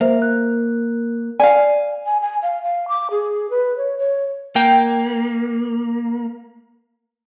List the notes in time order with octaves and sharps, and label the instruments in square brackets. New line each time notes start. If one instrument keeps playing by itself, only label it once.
[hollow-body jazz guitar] A#3 [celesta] C5 E5
[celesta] F#6
[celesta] D5 [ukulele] F5 G#5
[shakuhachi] G#5
G#5
F5
F5
D6
G#4
B4
C#5
C#5
[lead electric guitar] A#3 [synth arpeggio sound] G5